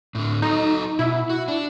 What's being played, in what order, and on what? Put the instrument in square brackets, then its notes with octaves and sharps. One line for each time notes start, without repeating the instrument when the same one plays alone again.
[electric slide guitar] A2 D3
[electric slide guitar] F#3 A4 [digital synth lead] D#4
[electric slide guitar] B2 [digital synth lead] E4
[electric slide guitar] F#4
D4